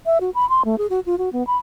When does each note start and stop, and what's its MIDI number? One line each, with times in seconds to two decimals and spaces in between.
0.06 0.18 76
0.21 0.30 66
0.35 0.48 83
0.49 0.63 84
0.65 0.78 57
0.78 0.87 68
0.90 1.00 66
1.06 1.18 65
1.18 1.29 66
1.33 1.46 59
1.47 1.57 83